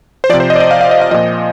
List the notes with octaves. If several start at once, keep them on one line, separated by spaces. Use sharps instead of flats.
C5
C3 F3 D5
C5
D#5
D5
D#5
F5
F5
D#5
F5
A#2 F3 D#5